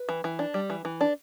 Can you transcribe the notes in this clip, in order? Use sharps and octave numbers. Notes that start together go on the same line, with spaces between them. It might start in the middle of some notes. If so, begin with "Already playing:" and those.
Already playing: B4
E3
E3
D4
G3
E3
E3
D4